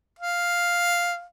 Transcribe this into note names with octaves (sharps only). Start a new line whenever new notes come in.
F5